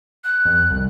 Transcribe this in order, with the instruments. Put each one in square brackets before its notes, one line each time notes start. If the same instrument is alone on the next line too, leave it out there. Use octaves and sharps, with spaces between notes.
[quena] F#6
[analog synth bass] F2
C2